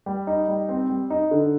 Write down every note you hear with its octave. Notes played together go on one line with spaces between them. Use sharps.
G3
D#4
G3
C4
G3
D#4
D3